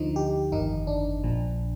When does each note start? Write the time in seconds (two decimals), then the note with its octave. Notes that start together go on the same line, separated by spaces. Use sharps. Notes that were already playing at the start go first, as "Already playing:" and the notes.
Already playing: D2 D3 F3 D#4
0.16 G4
0.52 G1 F2 D#3 D#4
0.87 D4
1.24 A#1 A#2 F3